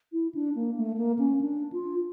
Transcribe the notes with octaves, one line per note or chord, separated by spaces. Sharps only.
E4
D4
A#3
A3
A#3
C#4
D4
F4